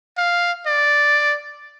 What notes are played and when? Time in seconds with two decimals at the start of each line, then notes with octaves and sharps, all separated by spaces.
0.17 F5
0.67 D5